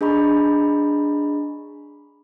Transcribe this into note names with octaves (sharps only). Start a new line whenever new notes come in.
D4 G#4 D#5 A#5 B5 C#6